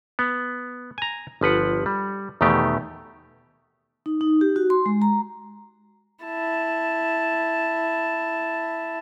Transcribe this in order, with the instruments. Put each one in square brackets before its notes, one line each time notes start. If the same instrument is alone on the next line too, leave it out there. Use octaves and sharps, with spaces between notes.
[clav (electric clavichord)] B3
G#5 A#5
G1 F3 B4 F#5
G3
E2 B2 D#3 A3 G4
[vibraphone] D#4
D#4
G4
F#4
C6
G#3
A#5
[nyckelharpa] E4 A5